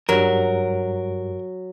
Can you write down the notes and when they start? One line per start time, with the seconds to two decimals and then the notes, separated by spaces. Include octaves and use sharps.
0.09 G2 F#3 G3 A#4